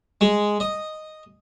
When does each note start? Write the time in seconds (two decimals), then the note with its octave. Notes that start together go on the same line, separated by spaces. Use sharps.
0.21 G#3
0.60 D#5